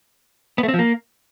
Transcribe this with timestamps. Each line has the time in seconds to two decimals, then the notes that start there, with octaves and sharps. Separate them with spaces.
0.58 B3
0.63 A3
0.68 C4
0.74 F3
0.79 A#3